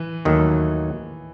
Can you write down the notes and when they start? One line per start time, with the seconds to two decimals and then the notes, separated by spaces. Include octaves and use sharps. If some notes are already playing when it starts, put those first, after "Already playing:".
Already playing: E3
0.25 D#2 D#3 F#3 A3